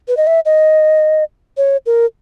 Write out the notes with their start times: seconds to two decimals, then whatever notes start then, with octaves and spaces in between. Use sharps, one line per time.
0.08 B4
0.17 D#5
0.27 E5
0.45 D#5
1.57 C#5
1.86 A#4